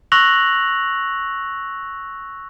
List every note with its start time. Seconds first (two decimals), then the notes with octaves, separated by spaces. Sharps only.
0.12 C#6 E6 F#6 A#6 F7 F#7